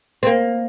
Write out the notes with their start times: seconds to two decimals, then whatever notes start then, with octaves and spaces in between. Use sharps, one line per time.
0.23 C4
0.27 A#3